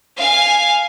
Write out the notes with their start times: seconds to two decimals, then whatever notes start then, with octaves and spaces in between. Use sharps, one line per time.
0.17 F5 G#5